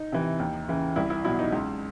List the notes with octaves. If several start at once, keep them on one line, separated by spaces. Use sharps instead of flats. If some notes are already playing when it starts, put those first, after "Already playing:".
Already playing: D#4
C3 E3
D#2
C#3 E3
C2 E4
E4
B2 F#3 E4
D#4
C#2